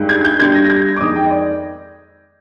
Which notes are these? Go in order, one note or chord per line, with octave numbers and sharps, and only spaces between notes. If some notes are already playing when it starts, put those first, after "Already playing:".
Already playing: G2 D#3 G#3
G#6
G6
G2 D3 G3 G#6
A#6
A#6
G#6
D6
F2 D#3 G#3 D#6
G5
D#5
D5